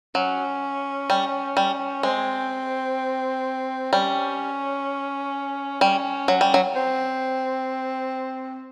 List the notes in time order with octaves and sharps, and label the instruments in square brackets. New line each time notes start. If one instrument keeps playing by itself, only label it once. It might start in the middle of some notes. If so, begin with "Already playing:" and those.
[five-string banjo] F#3 [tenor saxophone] C#4
[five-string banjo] G3
G3
[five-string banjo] G#3 [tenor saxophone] C4
[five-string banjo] G3 [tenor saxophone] C#4
[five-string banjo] G3 [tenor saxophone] C#4
[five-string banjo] F#3
G3
F#3
[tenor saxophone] C4